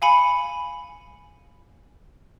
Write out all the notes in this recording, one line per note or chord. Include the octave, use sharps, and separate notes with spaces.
F5 G#5 B5 C#7